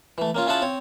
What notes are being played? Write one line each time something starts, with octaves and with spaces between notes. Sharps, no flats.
E3 A3
A#3 C#4 F4
C#4 E4 F4 G#4 F#5 A5
C4 C#5